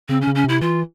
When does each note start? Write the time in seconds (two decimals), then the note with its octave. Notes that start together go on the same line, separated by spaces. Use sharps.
0.09 C#3 C4
0.21 C#4
0.27 C#3
0.35 C#4
0.44 C3 E4
0.61 E3 F4